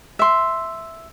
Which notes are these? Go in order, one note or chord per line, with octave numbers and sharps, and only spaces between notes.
E5 C6